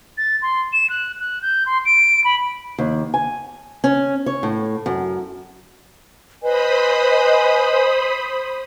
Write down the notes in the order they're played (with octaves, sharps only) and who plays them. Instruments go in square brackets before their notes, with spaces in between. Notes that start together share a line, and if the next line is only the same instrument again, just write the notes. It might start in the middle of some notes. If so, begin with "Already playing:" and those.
[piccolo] A6
C6
E7
F#6
F#6
G6
C6
D7
B5
[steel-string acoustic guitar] D#2
G#5
C#4
C#5
A2
F#2
[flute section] B4 D#5 G#5 [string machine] C5 B5 D#6